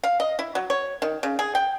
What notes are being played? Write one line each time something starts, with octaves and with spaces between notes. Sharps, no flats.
F5
D#5
E4
F#3
C#5
D#3
C#3
G#4
G5